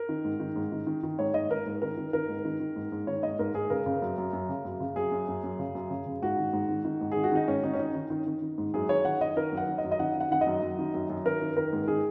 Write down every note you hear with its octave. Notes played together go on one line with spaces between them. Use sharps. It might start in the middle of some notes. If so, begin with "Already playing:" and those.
Already playing: A#4
D#3
G#2
D#3
G#2
D#3
D#3
D#3
G#2 C#5
G#2 D#5
D#3 A#4
G#2
D#3 A#4
D#3
D#3 A#4
G#2
D#3
D#3
G#2
G#2
D#3 C#5
G#2 D#5
G#2 A#4
G#2 G#4
C#3 A#4
C#3
F#2
F#2
F#2
C#3
F#2
C#3
F#2 G#4
F#2
F#2
F#2
C#3
F#2
C#3
C#3
G#2 F#4
D#3
G#2
D#3
D#3
G#2
D#3 G#4
F#4
D#3 D#4
G#2 C#4
D#3 D#4
C#4
D#3 D#4
D#3
D#3
D#3
D#3
G#2
F#2 G#4
D#3 C#5
D#3 F#5
D#3 D#5
D#3 A#4
F#2
F#5
D#3
D#5
F#2
D#5
D#3 F#5
D#3 F#5
D#3 F#5
D#5
F#2
F#2
D#3
F#2
F#2
D#3 A#4
D#3
D#3 A#4
G#2
D#3 G#4